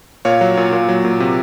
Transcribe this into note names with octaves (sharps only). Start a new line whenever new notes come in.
A#2 C#5 F5
F#3
A#2
A#2
F#3
A#2
C3